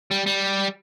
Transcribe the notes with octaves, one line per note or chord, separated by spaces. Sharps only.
G3
G3